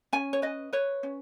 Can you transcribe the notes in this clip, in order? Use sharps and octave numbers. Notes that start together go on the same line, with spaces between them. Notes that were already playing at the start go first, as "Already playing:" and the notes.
C#4 G#5
C#5
B4 D#5
B4 C#5
C#4